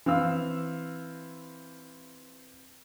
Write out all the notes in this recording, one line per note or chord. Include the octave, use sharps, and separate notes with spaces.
E3 C4 F5 E6